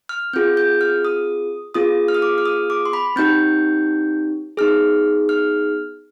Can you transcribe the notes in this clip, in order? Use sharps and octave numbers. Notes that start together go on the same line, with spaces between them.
F6
C4 F4 G#4 G6
G6
F6
D#6
B3 F4 G#4 D#6
F6
D#6
D6
F6
D#6
D6
C6
B5
C4 D#4 G4 G6
B3 D#4 G#4 F6
F6